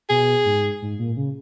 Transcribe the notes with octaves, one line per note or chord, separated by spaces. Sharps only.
B2 G#4
G#2
G#2
A#2
C#3